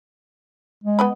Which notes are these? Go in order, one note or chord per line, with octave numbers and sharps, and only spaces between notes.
G#3
B3 D#5 B5